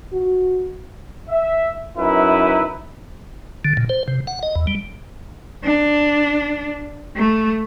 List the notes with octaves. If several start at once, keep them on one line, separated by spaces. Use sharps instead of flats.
F#4
E5
F#2 D#4 E4 B4
D3
A#2
C5
C3
F#5
D#5
E2
G3
D4
A3